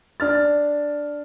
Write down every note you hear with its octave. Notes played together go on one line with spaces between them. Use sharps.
D4 F6 A6